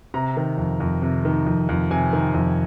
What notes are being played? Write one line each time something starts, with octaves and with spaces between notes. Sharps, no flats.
C3 A#5
D#3
F2
F2
C3
D#3
F2
F2
C3 G#5
D#3
F2